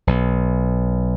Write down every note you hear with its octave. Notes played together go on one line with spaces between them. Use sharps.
B1